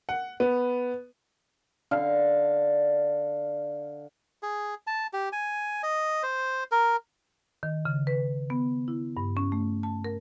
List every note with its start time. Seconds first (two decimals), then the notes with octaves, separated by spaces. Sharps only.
0.09 F#5
0.40 B3
1.91 D3 F5
4.43 G#4
4.87 A5
5.13 G4
5.33 G#5
5.83 D#5
6.23 C5
6.72 A#4
7.63 D#3
7.85 C#3
8.07 B4
8.50 B3
8.88 E4
9.17 G2
9.37 C#4
9.52 A3
9.83 A5
10.05 A#4